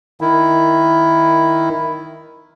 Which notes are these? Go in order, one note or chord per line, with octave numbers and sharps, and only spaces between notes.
D#3 E4